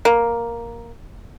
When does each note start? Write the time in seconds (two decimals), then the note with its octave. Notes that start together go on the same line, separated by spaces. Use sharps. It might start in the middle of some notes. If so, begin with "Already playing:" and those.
0.05 A#3